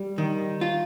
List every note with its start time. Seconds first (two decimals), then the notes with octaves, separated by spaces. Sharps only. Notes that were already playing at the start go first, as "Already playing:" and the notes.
Already playing: G3
0.18 D#3
0.61 F4